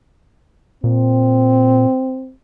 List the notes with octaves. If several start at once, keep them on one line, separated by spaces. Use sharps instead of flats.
A#2 C4